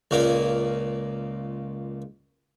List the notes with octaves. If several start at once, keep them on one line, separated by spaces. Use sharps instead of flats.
C#2 A#2 A#3